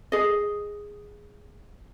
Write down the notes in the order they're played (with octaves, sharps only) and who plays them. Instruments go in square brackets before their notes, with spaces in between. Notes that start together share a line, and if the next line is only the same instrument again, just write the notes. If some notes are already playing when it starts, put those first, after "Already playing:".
[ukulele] G#4 D#5